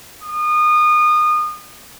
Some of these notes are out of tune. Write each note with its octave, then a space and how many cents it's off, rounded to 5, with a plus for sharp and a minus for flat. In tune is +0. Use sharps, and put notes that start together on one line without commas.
D#6 -30